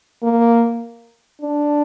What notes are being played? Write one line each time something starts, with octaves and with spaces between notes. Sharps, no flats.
A#3
D4